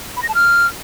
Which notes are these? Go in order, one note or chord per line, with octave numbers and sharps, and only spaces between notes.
B5
A#6
A5
F6